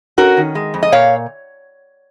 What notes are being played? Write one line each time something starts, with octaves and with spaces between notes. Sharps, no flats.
C#4 F#4 A#4
D#3
G#3
F2
D#5
A#2 C#5 F5